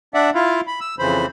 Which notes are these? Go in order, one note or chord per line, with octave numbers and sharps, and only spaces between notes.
D4 D5 E5 F#5
E4 F4 F5
B5
E6
F2 C#3 E3 C5 B5